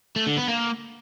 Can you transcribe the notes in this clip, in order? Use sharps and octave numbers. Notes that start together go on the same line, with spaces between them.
A3
D3
B3
A#3